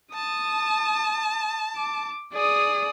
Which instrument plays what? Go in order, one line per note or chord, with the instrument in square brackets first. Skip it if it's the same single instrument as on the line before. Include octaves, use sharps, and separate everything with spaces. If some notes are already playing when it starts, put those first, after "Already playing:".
[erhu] A5 [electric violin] D#6
[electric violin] D6
[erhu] G#4 [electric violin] D5 D#6